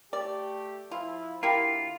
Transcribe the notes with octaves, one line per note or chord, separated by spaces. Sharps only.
A3 G4 D5
F3 E4 F4
D3 A#3 E4 F4 G4